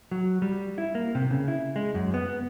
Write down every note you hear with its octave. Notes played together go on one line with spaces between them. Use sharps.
F#3
G3
E4
A#3
C3
C#3
E4
G#3
F#2
B3